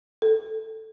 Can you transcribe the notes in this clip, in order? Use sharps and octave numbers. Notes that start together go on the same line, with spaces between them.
A4